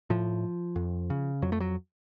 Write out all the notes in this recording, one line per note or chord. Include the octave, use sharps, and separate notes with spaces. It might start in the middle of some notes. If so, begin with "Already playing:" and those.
A2 F3
F2
C#3
F2 F#3
A3
F#3